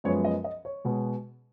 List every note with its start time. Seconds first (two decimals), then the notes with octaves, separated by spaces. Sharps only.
0.04 F#2 F3 G#3 B3 C#5
0.25 D#5
0.44 D#5
0.65 C#5
0.85 B2 G#3 B3